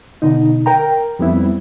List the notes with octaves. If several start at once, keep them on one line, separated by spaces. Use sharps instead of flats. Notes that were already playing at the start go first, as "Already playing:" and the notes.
B2 D3 D#4
A#4 G5 A#5
F2 G3 B3 C4 E4